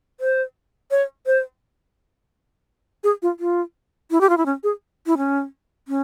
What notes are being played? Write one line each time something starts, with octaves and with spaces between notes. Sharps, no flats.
C5
C#5
C5
G#4
F4
F4
E4
G4
F4
E4
C#4
G#4
E4
C#4
C#4